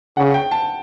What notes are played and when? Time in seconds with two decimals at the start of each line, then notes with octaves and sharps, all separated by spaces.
0.17 C#3 F#5
0.34 G5
0.51 A5